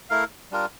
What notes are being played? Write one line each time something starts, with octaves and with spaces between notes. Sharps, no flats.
A3 E4 A#4 F5
G3 D4 F4 A#4